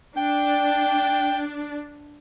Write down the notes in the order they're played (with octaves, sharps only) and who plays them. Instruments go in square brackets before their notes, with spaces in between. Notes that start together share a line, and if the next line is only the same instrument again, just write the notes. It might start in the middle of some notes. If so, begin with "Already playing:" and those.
[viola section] D4 [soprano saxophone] G5